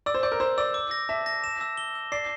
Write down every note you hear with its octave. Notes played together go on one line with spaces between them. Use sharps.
D5 E6
C5
D5 G6
A#4
C5 E6
D5 E6
D6
A#6
E5 A5
A#6
E7
E6
G7
E6
D5 C7